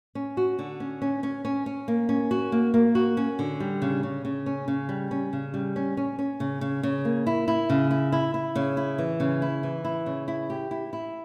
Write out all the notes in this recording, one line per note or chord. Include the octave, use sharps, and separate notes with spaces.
C#4
F#4
D3
C#4
C#4
C#4
C#4
C#4
A#3
C#4
F#4
A#3
A#3
F#4
C#4
D3
G3
C#3
C#3
C#3
C#4
C#3
G3
C#4
C#3
G3
C#4
C#4
C#4
C#3
C#3
C#3
A#3
E4
E4
C#3
E4
E4
E4
C#3
E4
E3
C#3
E4
E3
E4
C#3
E4
G4
E4
E4